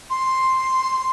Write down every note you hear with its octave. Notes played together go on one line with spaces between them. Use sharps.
C6